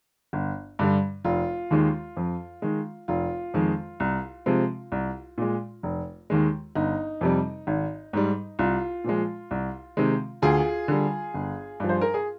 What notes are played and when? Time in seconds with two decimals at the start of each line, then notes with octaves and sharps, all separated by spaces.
0.33 G1
0.79 G2 D3 G3
1.25 F1 F4
1.71 D#2 D#3 G#3
2.17 F2
2.62 D#3 G#3
3.08 F1 F4
3.54 F2 D#3 G#3
4.00 C2
4.46 C3 F3 G#3
4.92 C2
5.38 A#2 G#3
5.83 F1
6.30 D#2 D#3 G#3
6.75 G1 D#4
7.21 F2 C3 G3
7.67 G#1
8.13 G#2 G3
8.59 C2 F4
9.04 A#2 F3 G#3
9.51 C2
9.97 C3 D#3 G#3
10.42 D2 F4 G#4
10.88 D3 G3
11.34 G1
11.80 G2 F3
11.89 C5
12.01 A#4
12.14 G#4